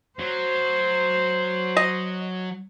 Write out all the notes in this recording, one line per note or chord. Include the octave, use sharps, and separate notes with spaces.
F#3 C5
D#5